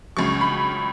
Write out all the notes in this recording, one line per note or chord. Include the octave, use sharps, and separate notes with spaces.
C#2 C#3 F#3 C#6
B5